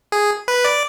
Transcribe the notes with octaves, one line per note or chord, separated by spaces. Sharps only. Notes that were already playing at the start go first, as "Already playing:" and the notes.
G#4
B4
D5